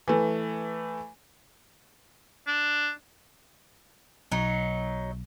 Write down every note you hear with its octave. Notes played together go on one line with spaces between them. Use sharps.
E3 A3
D4
B1 F#3 D#4